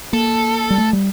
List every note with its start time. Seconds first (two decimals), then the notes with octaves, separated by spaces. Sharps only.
0.13 A#3 A4
0.70 G3
0.78 A3
0.93 G3